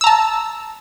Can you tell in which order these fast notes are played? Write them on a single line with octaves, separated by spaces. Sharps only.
E6 A#5 A5